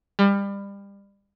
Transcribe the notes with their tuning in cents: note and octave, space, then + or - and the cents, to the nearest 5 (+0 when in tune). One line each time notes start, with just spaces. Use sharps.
G3 +30